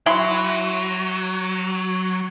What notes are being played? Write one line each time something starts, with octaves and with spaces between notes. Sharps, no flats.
F#3 E4 C6